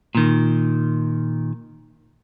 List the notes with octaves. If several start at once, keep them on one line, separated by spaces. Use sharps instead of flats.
A#2 D#3